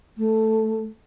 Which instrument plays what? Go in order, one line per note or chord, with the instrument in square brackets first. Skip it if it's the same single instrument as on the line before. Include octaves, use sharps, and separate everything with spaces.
[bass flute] A3